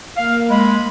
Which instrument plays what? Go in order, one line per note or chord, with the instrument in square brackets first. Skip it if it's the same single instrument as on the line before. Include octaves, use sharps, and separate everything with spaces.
[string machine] A#3 [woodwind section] F5
[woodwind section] G#3 [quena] B5